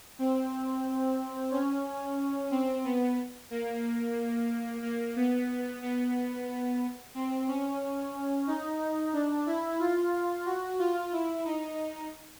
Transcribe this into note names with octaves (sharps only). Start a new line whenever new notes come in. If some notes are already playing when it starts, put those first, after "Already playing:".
C4
C#4
C4
B3
A#3
A#3
B3
B3
C4
C#4
D#4
D4
E4
F4
F#4
F4
E4
D#4